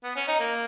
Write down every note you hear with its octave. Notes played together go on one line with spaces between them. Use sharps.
B3
C#4
D#4
A#3